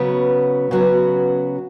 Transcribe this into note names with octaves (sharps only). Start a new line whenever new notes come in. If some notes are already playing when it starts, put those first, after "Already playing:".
Already playing: C#3 F#3 B3 F#4 B4
C#3 F#3 B3 F#4 B4